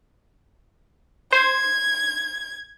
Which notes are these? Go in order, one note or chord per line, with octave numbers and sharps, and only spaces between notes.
C5 G#6